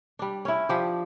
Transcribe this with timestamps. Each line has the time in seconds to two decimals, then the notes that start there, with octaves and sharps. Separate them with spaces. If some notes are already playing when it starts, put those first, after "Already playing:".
0.19 G3 D4
0.45 C#4 E4
0.69 F3 D4 G4